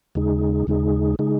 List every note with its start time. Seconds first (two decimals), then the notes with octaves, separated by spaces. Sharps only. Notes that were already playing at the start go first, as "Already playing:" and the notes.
0.15 D#2 C#3 G#3 D#4 G#4
0.67 D#2 C#3 G#3 D#4 G#4
1.19 C#3 G#3 D#4 G#4